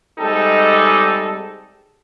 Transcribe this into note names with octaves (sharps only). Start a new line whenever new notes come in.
C3 G3 G#3 D#4 G4 A4